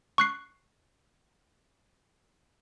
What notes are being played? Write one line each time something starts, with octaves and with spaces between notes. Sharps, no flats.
C#6 F#6 C7